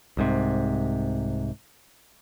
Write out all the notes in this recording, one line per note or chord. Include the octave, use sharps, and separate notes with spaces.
C2 G#2 C3